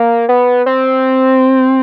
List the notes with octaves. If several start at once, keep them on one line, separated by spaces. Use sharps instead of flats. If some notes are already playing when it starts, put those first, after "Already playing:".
Already playing: A#3
B3
C4